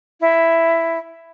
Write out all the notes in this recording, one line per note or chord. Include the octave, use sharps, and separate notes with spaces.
E4